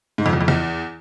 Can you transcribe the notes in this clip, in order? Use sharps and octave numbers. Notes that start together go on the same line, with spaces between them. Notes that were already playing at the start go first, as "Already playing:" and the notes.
G#2
F2
E2
F2
E2